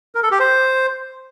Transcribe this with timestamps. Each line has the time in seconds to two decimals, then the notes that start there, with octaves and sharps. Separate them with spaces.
0.15 A#4
0.23 A4
0.31 G4
0.39 C5